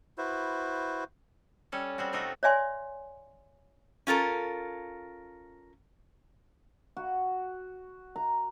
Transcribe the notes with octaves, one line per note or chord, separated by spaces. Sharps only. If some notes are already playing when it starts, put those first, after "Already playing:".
E4 F#4 B4 C5
G3 C#4 A4
G3 C4 F#4
C3 A3 D#4 F4 F#4
C#5 D5 E5 G#5 C6
C#4 F4 A4 A#4
F#4
A#5